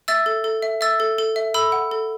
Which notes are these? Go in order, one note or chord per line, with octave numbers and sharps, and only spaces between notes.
E5 E6 A6
A4
A4
E5
E5 E6 A6
A4
A4
E5
A4 B5 E6
F#5
A4